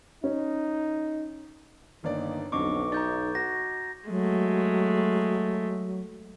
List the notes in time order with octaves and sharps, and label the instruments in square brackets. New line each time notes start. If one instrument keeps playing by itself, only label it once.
[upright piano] C#4 [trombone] D#4
[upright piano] G1 D5 [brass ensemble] D#3 A#3
[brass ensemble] B1 [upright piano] F2 D3 [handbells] D#5 C#6 D6
[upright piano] D#4 [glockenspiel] A#5 G6 A6
[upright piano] F#4 [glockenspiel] A#6
[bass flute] F#3 [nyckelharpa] G#3 A3